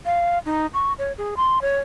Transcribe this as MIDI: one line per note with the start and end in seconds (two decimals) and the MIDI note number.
0.06 0.39 77
0.46 0.67 63
0.74 0.93 85
0.98 1.12 73
1.18 1.35 68
1.37 1.61 84
1.62 1.79 73